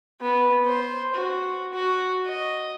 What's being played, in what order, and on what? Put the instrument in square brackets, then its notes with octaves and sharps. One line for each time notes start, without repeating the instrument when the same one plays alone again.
[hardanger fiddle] B3
C5
F#4
F#4
D#5